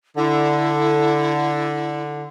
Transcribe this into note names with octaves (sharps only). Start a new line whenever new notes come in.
D3 E4